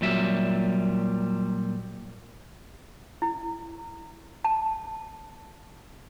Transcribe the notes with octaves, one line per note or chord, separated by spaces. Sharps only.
A#2 F#3 G3 E5
E4
A5